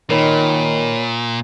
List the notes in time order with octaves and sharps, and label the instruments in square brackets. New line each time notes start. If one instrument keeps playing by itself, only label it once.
[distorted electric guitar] A#2 [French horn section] D#3 [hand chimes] A#4 C#5 B5